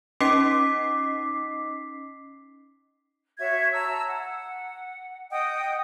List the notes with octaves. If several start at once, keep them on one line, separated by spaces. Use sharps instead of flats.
C#4 D#4 D#5 D6 B6 C7
F#4 C#5 E5 G#6
A5 A#5 E6
F#5
D#5 F#5 G5 D#6